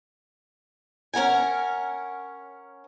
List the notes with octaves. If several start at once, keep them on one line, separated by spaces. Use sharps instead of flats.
C#4 A#4 F#5 G#5